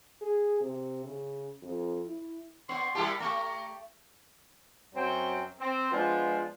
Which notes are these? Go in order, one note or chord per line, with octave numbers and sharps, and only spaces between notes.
G#4
C3
C#3
F2
E4
B3 C#5 D5 F#5 C6
G3 E4 G4 A#4 A5
A3 G4 A5 A#5 C#6
F#2 F#3 C4 G5
C4
F3 G#3 B3 D4 F4